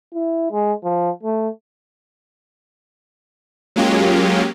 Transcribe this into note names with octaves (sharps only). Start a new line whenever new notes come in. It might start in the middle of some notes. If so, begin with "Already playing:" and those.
E4
G#3
F3
A3
F#3 G#3 A#3 C#4 F4 G4